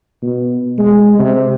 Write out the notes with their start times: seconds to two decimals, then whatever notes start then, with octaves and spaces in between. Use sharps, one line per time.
0.22 B2
0.79 G#3
1.19 C3